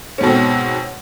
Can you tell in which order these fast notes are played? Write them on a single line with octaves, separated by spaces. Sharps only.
C#4 G#2 B2 C4